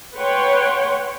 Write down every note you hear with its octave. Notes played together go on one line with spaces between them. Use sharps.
B4 C#5 F#5 G5 C6